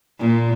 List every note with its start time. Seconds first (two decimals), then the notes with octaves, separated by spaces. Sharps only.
0.19 A#2